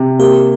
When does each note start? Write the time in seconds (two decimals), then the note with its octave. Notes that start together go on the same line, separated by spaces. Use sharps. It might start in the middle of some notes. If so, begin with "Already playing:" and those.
Already playing: C3
0.19 A#3 G4